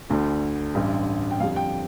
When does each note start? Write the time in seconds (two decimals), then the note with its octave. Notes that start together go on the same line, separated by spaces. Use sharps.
0.10 D2 D3 A3
0.75 A1 G2 D3
1.31 G5
1.40 F2 D3 G3 F5
1.56 G5